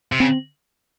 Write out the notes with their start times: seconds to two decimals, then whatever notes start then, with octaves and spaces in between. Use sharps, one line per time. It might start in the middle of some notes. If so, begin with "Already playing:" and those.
0.12 C3
0.20 C#3 C4